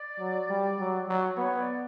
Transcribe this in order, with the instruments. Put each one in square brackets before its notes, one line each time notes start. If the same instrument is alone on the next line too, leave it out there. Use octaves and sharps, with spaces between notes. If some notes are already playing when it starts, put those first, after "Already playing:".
Already playing: [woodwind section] D5
[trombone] F#3
G3
F#3
F#3
[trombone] B3 [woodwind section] C#5
[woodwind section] D5